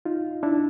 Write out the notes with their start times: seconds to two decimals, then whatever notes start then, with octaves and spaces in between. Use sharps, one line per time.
0.05 D#4 F4
0.43 D4 E4